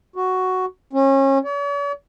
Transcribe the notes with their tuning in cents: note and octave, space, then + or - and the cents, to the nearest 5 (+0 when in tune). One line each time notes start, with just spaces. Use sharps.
F#4 +5
C#4 -30
C#5 +45